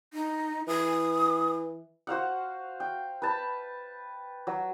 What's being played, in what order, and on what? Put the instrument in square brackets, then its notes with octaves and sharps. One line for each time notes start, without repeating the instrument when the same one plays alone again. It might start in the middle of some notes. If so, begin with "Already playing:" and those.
[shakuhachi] D#4
[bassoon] E3 [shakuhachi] D#6
[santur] F#4 C5 F5 F#5
G5
B4 A5 B5
F#3